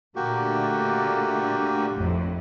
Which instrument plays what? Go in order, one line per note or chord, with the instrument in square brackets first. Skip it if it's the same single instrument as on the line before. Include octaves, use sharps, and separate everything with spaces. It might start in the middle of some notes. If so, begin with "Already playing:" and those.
[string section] A#2 D3 A3 [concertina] A#3 F#4 G4
[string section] G#1 F2 A2